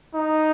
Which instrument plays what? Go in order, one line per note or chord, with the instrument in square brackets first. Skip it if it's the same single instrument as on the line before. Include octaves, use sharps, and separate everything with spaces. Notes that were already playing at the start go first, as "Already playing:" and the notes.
[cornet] D#4